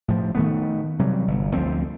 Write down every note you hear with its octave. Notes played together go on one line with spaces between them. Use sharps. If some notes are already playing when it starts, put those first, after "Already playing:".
A2 F3
D#3 A3 B3
C3 F#3 G3
G1
D2 F3 C4